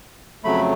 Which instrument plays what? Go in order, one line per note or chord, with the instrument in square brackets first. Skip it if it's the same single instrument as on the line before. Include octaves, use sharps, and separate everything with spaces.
[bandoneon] F2 C#3 F#3 A3 B5